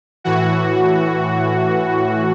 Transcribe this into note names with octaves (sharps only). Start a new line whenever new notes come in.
A2 E3 F#4